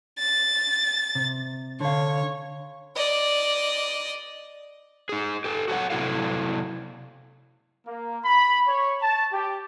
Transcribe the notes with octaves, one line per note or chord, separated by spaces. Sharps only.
A6
C3
D3 C#5 F5
D5 D#5
D#4 G#4
G4 A4
F#4 A4 A#4 C#5 F#5
C3 F#3 E4 A4 F5
A#3
B5
C#5
A5
G4